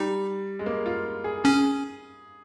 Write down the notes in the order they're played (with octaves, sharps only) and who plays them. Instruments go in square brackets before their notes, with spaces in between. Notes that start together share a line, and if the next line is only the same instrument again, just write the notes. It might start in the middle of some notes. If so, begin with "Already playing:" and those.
Already playing: [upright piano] G3 [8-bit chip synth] D#4
[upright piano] G#3
A#3
F4
G#4
[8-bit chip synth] C#4 [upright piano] G#4